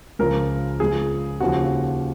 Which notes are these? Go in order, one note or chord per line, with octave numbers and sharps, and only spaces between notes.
C#2 C#3 F3 A#4
C#2 C#3 F3 G#4
D#2 C#3 F3 F#4